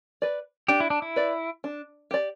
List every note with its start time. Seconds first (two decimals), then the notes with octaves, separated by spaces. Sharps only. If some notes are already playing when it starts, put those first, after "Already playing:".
0.22 B4 D5
0.68 D4 G4
0.80 E4
0.90 D4
1.02 E4
1.16 B4 D5
1.64 D4
2.11 G4 D5